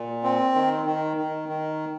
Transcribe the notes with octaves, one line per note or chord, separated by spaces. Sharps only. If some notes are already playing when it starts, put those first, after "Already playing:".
Already playing: A#2
C4
D#3
D#3
D#3
D#3